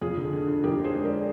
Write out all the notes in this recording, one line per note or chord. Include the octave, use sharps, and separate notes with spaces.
F2 F4 G#4
D3
D3
D3
F2 G4 A#4
D3
G#4 C5
G#3
A#4 D5